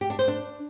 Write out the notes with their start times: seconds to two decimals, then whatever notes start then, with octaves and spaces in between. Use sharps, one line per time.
0.01 G4
0.10 D4
0.19 C5
0.28 D4